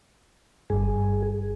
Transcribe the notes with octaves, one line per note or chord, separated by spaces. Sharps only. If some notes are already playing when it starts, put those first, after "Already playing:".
G1 G2 G#4